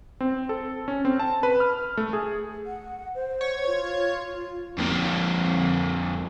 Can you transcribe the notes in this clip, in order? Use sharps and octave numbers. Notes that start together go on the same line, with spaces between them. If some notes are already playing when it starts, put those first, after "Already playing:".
C4
A4
C#4
C4
A5
B4
F6
A3
G#4
F#5
C5
C#5
F4
F2 A#3